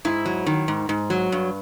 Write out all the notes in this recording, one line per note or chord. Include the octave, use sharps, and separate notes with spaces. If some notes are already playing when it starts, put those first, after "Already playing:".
G#2 E4
F#3
D#3
G#2
G#2
F#3
G2